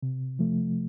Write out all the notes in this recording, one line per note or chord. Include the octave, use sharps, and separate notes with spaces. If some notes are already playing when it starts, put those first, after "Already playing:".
C3
F3 A3